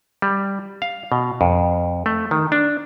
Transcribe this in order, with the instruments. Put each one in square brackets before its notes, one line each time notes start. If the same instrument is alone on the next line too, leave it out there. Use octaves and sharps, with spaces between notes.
[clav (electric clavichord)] G3
F5
B2
F2
A3
D#3
D4